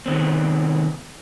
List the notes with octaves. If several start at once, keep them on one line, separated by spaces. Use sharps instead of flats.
C3 D#3 B3 C4